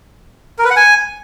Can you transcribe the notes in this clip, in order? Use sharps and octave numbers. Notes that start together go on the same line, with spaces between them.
A#4
B4
F#5
G#5